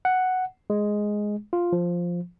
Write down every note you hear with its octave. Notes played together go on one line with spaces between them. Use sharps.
F#5
G#3
F4
F3